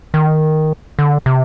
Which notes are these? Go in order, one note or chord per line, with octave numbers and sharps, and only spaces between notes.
D#3
D3
C3